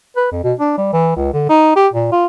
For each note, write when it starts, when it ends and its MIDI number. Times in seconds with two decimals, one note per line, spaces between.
0.17 0.28 71
0.32 0.42 41
0.43 0.53 47
0.60 0.73 62
0.78 0.90 55
0.93 1.13 52
1.16 1.32 37
1.33 1.46 50
1.49 1.76 63
1.76 1.88 67
1.94 2.10 46
2.12 2.26 65